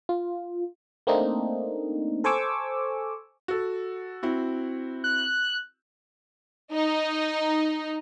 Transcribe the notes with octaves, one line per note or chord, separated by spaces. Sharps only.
F4
A3 A#3 C4 D4 D#4
A4 C5 G#5 C#6 D6 E6
F#4 A4
C4 E4 F#4
F#6
D#4